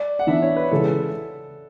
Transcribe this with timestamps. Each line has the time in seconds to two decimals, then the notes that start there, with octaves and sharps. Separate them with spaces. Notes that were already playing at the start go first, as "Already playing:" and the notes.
Already playing: D5
0.19 F#5
0.27 E3 B3 D4 E5
0.42 C#5
0.56 B4
0.71 C#3 E3 G#3 A4